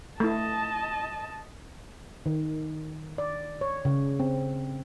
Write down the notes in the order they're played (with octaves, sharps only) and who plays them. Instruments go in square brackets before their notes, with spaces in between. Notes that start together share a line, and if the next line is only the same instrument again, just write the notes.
[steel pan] A3 E4 [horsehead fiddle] D#5 A5
[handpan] D#3
D5
C#5
C#3
C4